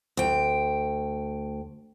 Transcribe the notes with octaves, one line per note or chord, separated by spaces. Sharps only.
D2 G5